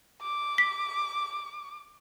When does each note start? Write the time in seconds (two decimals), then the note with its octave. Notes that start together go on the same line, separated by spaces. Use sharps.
0.22 D6
0.58 B6